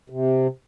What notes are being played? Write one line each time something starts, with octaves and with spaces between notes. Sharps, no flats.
C3